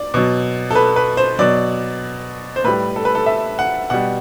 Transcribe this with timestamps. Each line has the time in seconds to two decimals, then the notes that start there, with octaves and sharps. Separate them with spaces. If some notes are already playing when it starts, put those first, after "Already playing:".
Already playing: D5
0.14 B2 F#3
0.71 A4
0.76 B4
0.96 B4
1.17 C5
1.39 B2 F#3 D5
2.56 C5
2.64 A2 G3 B4
2.96 A4
3.05 B4
3.15 A4
3.26 E5
3.59 F#5
3.90 B2 G3 F#5